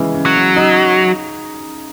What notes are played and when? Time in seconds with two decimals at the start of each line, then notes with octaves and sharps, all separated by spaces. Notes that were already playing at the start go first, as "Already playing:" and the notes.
Already playing: C#3 E3 G#3
0.14 C#3
0.26 F#3
0.36 C#3
0.56 D#4